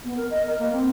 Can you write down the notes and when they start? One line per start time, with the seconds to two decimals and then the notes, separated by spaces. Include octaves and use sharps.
0.04 B3
0.17 A#4
0.31 D#5
0.47 A#4
0.59 A#3
0.72 C4